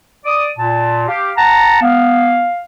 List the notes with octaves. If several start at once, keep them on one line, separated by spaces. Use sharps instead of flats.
D5 D#6
A#2 A5
G4 F5
F#5 A5 A#5
B3 F5